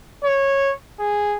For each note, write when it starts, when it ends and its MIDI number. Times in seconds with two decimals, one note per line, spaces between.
0.24 0.72 73
0.99 1.38 68